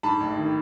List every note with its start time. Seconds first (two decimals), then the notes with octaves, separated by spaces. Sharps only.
0.03 G#2 A5 B5
0.20 A1
0.37 D#3